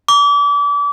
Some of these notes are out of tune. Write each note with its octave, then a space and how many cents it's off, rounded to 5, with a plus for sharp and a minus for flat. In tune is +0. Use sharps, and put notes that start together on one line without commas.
D6 -35